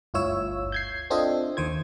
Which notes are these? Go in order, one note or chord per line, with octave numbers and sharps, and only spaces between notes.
G1 D2 E4 F4 C#5 E6
G6 G#6 C7
C4 D4 F4 A4 D#5 E5
D#2 D#3 C5 G#6